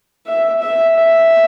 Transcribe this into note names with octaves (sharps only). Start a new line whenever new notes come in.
E5
E5
E5